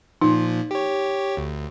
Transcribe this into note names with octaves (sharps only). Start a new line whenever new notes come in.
A#2 F3 D#4
G4 C#5
D2